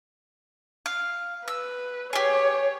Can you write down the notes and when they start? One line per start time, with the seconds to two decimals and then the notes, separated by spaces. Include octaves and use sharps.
0.86 F5
1.48 B4 E6
2.13 G4 G#4 C#5